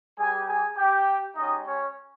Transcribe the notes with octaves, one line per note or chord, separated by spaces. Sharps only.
G3 B3 G4 G#4 G#5
G#4 G#5
G4 G5
G#3 C#4 D#4 G4 D#5
C#4 C#5